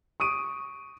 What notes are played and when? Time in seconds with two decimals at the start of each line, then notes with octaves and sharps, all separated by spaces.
0.20 C#6 D#6 D7 D#7